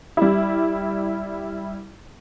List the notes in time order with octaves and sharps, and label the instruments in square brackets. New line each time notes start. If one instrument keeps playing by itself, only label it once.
[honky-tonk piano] G3 E4